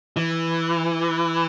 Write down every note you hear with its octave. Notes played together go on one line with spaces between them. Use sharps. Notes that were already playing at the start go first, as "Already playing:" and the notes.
E3